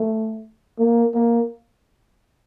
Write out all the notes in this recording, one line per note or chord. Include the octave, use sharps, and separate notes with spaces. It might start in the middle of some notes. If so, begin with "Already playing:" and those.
Already playing: A3
A#3
A#3